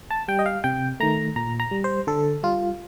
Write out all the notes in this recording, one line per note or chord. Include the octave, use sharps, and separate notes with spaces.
A5
G3 G5
D#5
F5
C3 G5
D#3 A3 A#5
A#2 A#5
A#5
G3
C5
D3 A4
G3 F4